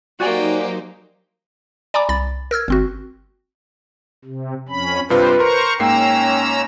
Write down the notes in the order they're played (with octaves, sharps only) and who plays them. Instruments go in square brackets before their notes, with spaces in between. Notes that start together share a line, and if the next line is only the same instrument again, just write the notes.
[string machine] F#3 D#4 C5 [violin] A#3 G4 [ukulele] F#4 D5 G#5
[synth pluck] D5 G#5 A#5 B5 D6
C2 B5 A6
A#4 E6 F6 G#6
G1 C4 F#4
[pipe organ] C3
F2 C#4 B5
[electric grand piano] G2 C3 F4 [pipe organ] G4 C5 [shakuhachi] B4
[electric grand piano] A#4 C6 [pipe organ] C5 A#5 C#6
[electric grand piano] G#2 A#3 C7 [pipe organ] C#4 A#5 E6 [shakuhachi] G5